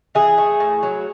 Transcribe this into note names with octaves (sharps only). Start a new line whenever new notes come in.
E3 G#4
A3
A2
F#3